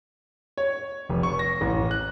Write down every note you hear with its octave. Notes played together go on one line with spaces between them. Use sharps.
C#5
F1
C#6
A#6
A1
F#6